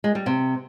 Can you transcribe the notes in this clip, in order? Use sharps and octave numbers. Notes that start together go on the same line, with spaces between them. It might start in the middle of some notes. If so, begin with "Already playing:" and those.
G#3
G3
C3